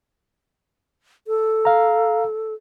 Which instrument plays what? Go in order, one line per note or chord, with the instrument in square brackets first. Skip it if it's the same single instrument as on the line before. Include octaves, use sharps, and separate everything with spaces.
[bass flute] A4
[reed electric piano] F5 A#5